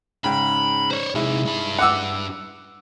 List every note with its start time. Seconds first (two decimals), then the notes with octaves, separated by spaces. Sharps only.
0.24 G#2 C#3 G5 B5
0.91 C5 C#5
1.15 C3 G#3 D#4 E4
1.45 G2 B5
1.79 F#5 D6 E6